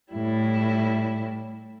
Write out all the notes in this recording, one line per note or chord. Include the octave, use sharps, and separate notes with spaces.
A2 G3 E4